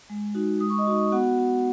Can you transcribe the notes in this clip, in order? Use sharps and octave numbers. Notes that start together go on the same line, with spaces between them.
G#3
D#4 F#4
G#3 D#6
C#6
D#5 D#6
D#4 F#4
B3 F#4 F#5
F#4